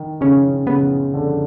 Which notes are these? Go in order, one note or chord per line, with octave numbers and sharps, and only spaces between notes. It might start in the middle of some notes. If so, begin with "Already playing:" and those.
Already playing: D#3
C#3 C#4
C#3 B3
D3